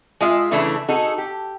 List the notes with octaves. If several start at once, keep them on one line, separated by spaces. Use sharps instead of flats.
G#3 F4 E5
C#3 E3 A3 D4 E4
D#4 F#4 G#4 A4
G4